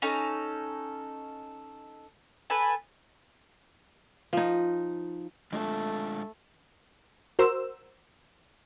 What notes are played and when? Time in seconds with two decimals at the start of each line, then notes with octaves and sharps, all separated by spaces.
0.02 C#4 D#4 A4
2.50 A4 B4 G#5
4.33 F3 D#4
5.52 G#3 A3 D4 F4
7.39 F#4 A#4 C5 E6 E7